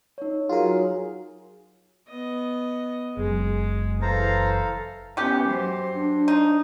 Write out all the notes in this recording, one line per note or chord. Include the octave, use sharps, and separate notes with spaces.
D#4 C#5
F#3 F4 F#4 G#4 A#4
B3 D#5
F#1 F#3 G#3 G#4
E3 A4 C5 F5 A#5
E3 B3 C#4 G4
F#3 C5
D4
D#4